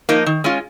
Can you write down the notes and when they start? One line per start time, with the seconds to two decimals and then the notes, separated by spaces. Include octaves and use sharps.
0.09 F3 A#3 D#4
0.26 D#3
0.44 G#3 C#4 F4